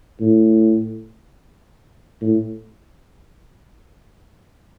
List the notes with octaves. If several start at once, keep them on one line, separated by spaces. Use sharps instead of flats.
A2
A2